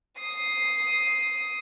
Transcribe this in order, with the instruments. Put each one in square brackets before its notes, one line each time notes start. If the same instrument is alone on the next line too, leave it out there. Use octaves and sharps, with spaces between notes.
[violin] D#6 C7